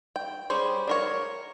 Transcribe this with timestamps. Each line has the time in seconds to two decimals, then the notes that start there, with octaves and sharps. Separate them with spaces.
0.16 G5
0.50 G3 C#4 G#4 C5
0.88 D4 A#4 C#5